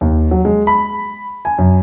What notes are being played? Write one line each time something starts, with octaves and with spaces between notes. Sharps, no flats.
D#2
F#3
G#3
B5
G#5
F#2